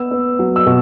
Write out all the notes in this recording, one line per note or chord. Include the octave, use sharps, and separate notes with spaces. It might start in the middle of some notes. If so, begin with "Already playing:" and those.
Already playing: B3 E6
B3
F#3
E6
B2